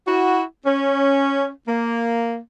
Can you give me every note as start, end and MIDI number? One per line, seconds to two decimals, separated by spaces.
0.07 0.44 64
0.07 0.44 66
0.65 1.49 61
1.68 2.38 58